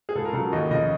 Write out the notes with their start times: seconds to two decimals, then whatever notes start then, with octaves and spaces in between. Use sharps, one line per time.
0.09 G#4
0.15 C#2 A4
0.25 A#4
0.33 C#3 F#3 A4
0.52 D#2 D#5
0.71 C#3 F3 D#5